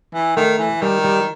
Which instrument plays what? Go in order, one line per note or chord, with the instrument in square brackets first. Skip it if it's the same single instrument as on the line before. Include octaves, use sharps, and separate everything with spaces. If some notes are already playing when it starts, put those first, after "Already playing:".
[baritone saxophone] E3
[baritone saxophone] D#3 [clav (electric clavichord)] A3
[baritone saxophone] E3
[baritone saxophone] D#3 [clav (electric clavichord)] G3
[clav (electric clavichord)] G3